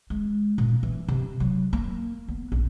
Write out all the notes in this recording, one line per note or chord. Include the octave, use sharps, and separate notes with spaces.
G#3
A#2
E3
C3
F#3
A#3
B3
A#1